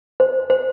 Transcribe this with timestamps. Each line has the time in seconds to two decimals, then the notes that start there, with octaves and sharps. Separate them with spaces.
0.20 C5
0.50 C5